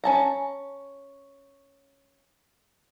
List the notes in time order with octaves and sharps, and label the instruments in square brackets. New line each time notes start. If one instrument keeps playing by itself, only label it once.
[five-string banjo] C#4 A5 A#5